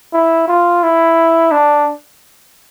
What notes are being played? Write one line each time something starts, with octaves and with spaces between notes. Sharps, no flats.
E4
F4
E4
D4